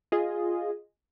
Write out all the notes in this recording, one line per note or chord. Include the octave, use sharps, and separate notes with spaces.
F4 G#4 D#5